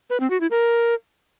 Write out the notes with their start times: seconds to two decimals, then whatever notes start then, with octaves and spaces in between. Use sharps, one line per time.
0.10 B4
0.20 C4
0.30 F#4
0.41 E4
0.51 A#4